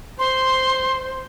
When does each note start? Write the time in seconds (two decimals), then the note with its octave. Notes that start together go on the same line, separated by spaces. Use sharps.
0.19 C5 C6